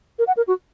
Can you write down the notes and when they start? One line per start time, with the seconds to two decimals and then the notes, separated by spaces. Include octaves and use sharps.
0.19 A#4
0.27 F#5
0.37 A#4
0.47 F#4